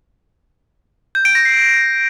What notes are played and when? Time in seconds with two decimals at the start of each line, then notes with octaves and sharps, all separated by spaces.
1.15 G6
1.25 D7
1.35 A#6
1.45 C7